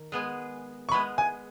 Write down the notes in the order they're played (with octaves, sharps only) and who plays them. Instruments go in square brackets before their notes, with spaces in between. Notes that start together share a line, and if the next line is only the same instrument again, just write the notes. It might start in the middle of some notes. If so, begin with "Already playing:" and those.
Already playing: [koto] D#3
G#3 B3 G#4
[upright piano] C#6
[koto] G#3 B3 G#4 [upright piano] B5
[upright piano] G#5